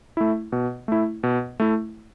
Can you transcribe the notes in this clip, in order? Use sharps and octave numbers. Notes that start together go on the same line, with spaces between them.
A3 E4
B2
A3 E4
B2
A3 E4